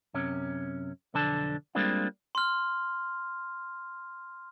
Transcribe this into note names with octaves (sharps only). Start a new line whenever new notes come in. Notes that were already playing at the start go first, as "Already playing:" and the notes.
F#2 C3 C#4
B1 F2 D3 D4 A5
G3 G#3 A#3 C4 D4 F4
C6 F6